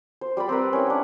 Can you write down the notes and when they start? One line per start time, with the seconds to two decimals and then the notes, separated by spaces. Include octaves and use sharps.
0.21 C5
0.37 G3 C5 D5 B5
0.49 C4 A#4 B4
0.73 C#4 E4
0.87 D4 F#5